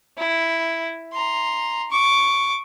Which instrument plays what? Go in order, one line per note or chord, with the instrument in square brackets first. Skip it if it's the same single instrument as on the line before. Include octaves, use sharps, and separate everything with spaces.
[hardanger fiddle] E4
A#5 C6
C#6 D6